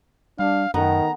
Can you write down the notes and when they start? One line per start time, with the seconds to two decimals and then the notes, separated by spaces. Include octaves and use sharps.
0.39 G3 D4 F5
0.74 F#2 D#3 A3 B3 A#5